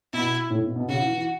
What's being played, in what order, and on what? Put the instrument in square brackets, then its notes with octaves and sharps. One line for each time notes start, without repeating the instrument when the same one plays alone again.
[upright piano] B2 [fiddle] E4
[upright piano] A2
B2
B2
[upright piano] C#3 [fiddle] F#4
[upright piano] E3
E3